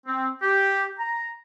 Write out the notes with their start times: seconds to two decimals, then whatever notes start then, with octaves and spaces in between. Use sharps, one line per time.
0.06 C4
0.43 G4
0.99 A#5